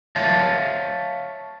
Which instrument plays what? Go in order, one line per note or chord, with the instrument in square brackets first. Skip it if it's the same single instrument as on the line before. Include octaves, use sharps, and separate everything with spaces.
[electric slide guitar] C#5 E5 F5 A5